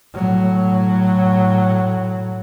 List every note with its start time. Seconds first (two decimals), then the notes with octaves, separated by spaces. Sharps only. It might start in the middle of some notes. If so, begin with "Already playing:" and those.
0.14 A2 F#3